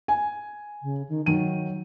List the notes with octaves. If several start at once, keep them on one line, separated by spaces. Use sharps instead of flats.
G#5
C#3
D#3
D#3 F#3 D#7